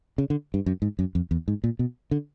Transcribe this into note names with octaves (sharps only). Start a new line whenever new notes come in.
C#3
D3
G2
F#2
G#2
F#2
F2
E2
G#2
A#2
B2
D3